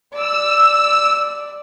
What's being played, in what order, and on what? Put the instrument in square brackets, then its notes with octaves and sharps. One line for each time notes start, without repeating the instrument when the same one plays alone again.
[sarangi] D5 [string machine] E6